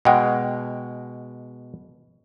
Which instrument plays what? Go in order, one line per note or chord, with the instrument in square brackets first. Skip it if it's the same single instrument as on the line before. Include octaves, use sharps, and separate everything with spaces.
[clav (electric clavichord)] B2 G#3 [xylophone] F#5 G5